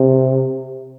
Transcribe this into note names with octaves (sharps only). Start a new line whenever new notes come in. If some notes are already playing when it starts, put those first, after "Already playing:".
Already playing: C3